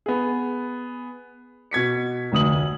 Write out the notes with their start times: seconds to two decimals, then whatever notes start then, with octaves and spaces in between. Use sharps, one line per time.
0.06 B3 G#4
1.71 B2 G#6 B6 C#7
2.32 F1 D2 D#6 F#7